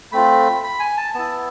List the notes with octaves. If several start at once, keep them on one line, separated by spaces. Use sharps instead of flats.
A3 C4 F4 B5
B5
G#5
A5
B3 E4 A5